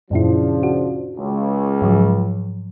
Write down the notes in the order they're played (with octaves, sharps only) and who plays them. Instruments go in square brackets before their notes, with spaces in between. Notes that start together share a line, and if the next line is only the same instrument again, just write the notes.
[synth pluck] F#2 A#2 E4 [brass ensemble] C#3 F3 D4
[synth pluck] F#4
[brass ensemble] C#2
[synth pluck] G#2 F3 F#3